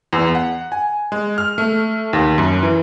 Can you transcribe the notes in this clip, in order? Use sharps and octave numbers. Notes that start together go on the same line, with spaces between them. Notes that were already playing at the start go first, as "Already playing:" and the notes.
E2
F#5
G#5
G#3
F6
A3
D#2
F#2
E3